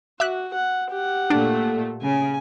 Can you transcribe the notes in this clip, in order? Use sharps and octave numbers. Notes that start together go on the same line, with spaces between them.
F#4 E5 D6 F#6
F#5
G4 F#5
A#2 A3 D4
C#3 G#5